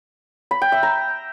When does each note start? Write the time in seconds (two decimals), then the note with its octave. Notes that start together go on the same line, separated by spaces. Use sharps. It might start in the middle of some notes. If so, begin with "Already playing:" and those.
0.51 B5
0.62 G5
0.72 E5
0.83 A#5